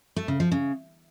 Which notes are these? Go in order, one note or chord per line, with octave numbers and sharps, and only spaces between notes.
A3
C#3
F3
C#3